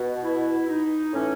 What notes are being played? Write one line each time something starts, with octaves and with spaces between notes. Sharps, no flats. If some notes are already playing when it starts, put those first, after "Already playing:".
Already playing: B2
E4
D#4
A2 E3 C#4